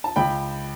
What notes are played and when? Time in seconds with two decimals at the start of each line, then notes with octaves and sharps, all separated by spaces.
0.04 A5
0.16 C#2 G5 B5